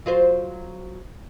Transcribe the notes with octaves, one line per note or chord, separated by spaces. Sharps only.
F#3 F4 C5